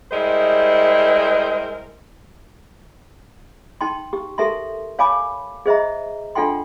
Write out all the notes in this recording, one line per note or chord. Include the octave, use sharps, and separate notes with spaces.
G3 G#3 E4 A#4 C5 D#5
D#4 G5 A5 C6
G4
G4 A4 A#4 E5 A5 C6
C#5 F5 G#5 A5 B5 D6
G#4 C5 D#5 E5 A#5
D4 F4 A4 F#5 G5 C6